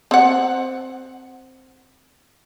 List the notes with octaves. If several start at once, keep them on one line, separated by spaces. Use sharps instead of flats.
C4 F#5